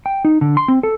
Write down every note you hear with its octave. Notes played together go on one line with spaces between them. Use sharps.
G5
D#4
D3
C6
C4
A4